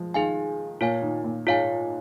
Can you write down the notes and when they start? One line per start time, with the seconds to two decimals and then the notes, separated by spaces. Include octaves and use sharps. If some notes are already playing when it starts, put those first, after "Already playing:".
Already playing: F3 G#3
0.14 D#3 G#4 F5 G#5
0.81 A#2 F4 C#5 F5 G#5
1.02 D#3
1.24 A#2
1.47 G#2 F4 C#5 F5 G#5